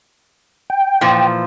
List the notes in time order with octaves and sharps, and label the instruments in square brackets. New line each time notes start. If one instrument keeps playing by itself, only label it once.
[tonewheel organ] G5
[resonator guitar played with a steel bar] A#2 E3 F3